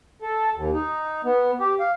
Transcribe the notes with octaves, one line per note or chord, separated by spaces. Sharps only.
A4
D#2
D#4
B3
G4
F5